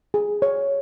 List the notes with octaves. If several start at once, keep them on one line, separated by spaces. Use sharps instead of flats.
G#4
C#5